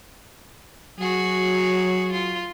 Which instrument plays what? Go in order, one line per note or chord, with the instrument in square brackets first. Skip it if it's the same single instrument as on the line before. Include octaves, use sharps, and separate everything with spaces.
[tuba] F#3 [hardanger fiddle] F#4 G#4
[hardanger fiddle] F4